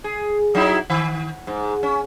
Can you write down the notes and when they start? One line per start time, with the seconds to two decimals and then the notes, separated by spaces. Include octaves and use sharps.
0.04 G#4
0.55 F#3 D#4 E4
0.90 D#3
1.47 G#2
1.83 C#4